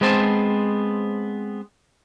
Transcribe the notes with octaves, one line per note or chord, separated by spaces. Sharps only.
G#3 B3 C4 C5 A5